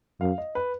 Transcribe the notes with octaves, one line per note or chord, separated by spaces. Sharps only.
F#2 F5
D#5
B4